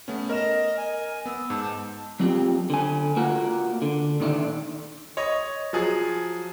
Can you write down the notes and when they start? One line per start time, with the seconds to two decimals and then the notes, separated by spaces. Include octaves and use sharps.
0.08 A3 B3 C#4
0.29 A#4 D#5 F6 E7
0.77 G#5
1.26 B3 E6
1.50 G#2 A5
2.20 F#3 C4 F4 G4
2.70 D3 G#5
3.17 A#3 F4 F#4 A#4
3.82 D3
4.20 A#2 D#3 D4 E5
5.17 C#5 D#5
5.73 F3 F#3 G#4